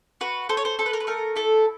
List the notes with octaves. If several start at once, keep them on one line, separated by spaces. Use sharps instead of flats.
F#4 B4
A4 C5
C#5
C5
A4 C5
B4
A#4
B4
A3 A#4
E4 A4